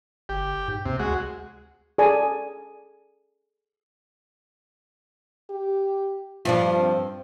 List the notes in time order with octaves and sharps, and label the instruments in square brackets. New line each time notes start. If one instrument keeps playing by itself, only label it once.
[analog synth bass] G1 [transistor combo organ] G4
[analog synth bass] G#2
[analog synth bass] D#2 [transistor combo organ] C3
[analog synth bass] D2 [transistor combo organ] G#3 F#4
[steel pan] G#4 A4 D5 G#5 A5
[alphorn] G4
[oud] G2 F3 D4 [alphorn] F4
[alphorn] C4